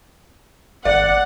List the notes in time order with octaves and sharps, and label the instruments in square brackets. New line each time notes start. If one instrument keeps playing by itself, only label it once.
[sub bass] G#1 [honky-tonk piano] D5 [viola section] F#5